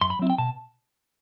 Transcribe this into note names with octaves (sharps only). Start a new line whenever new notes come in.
F#2 C6
B5
F#3 C4 E4
G5
B2 A5